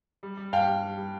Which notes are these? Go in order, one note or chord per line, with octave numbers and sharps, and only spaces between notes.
G3
G3
G2 F5 G5
G3
G3
G3